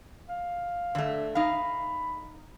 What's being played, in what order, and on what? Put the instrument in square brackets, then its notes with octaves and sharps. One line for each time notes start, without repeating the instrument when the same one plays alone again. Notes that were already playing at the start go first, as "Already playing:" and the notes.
[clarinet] F5
[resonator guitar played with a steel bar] D3 A3
[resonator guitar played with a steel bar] D#4 F5 [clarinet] B5